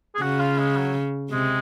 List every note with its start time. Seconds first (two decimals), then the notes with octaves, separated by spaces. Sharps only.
0.15 G#4
0.21 C#3 F#4
0.40 F4
0.59 G#3
0.76 F#3
1.30 C3 G#3